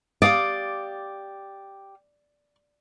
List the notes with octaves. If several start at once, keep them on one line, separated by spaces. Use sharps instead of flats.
G4 D5 F5 D#6